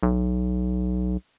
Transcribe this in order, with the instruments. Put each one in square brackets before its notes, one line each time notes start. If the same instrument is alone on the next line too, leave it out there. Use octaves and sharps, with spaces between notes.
[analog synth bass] B1